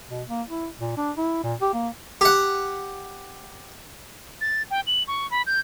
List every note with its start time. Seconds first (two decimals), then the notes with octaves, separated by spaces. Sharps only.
0.10 B2
0.28 A#3
0.48 E4
0.80 A#2
0.97 D4
1.17 E4
1.44 A#2
1.61 G4
1.73 A#3
2.21 G4 F#5
4.41 A6
4.71 G5
4.87 F#7
5.08 C#6
5.31 B5
5.46 G6